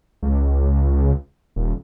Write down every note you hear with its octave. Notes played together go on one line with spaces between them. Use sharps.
C#2
D#1